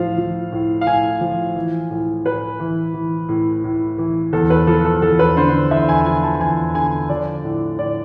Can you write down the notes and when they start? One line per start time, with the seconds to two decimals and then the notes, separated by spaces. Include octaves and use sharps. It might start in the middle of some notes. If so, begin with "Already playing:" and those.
Already playing: A2 F3 F5
0.18 F3
0.52 A2
0.81 F5
0.86 A2 G#5
1.21 F3
1.55 E3
1.90 A2
2.25 A2 B4
2.60 E3
2.94 E3
3.29 A2
3.64 A2
3.98 E3
4.33 E2 A4
4.50 B4
4.67 F3 A4
4.85 A4
5.02 E2 A4
5.19 B4
5.36 D3 C5
5.71 E2 E5
5.89 G#5
6.06 F3 G#5
6.23 A5
6.41 E2 G#5
6.75 D3 G#5
7.09 F3 D5
7.44 A2
7.79 A2 D5